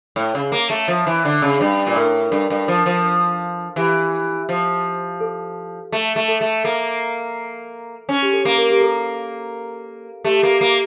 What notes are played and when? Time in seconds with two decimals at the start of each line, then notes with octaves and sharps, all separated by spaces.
0.16 A2 C#5
0.35 C#3
0.52 A#3
0.70 A3
0.88 F3
1.06 E3
1.25 D3
1.42 C#3
1.61 G2
1.87 A#2
1.96 A2 A#4
2.32 G2 A4
2.50 G2
2.68 F3
2.86 F3
3.76 E3 G4
4.49 F3
5.20 A4
5.92 A3
6.16 A3
6.28 A4
6.41 A3
6.64 A#3 A4
8.09 C#4
8.22 G4
8.33 A4
8.45 A#3
8.57 A#4
8.70 G4
8.81 A4
10.24 A3 G4
10.32 A4
10.39 G4
10.43 A#3
10.49 A4
10.61 A#3